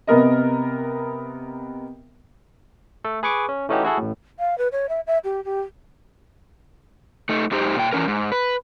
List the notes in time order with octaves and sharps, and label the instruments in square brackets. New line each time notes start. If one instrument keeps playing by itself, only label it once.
[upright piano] C3 B3 A#4 D#5
[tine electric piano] A3 A4
G#4 B4 G#5 C#6 D6
C#4
E3 A3 C#4 D#4 F#4 G4
E4 F#4 G#4 A4
A1 A2
[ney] F5
B4
C#5
E5
E5
G4
G4
[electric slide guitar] A3 D#4
G#2 D#4 G4 C5
A#2 G5
E3 G3 C#4 A#4
G#2
B4